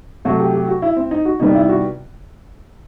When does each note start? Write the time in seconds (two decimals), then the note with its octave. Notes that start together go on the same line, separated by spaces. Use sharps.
0.25 C3 F#3 A3 F#4
0.40 G4
0.54 G4
0.68 F#4
0.82 E4
0.96 C4
1.11 D#4
1.25 F#4
1.40 C3 D#3 G3 B3 D#4
1.55 E4
1.69 F#4